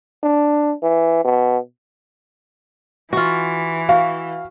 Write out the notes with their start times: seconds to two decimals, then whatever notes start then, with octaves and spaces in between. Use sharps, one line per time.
0.23 D4
0.83 E3
1.24 B2
3.13 E3 F4 F#4
3.89 F#4 F5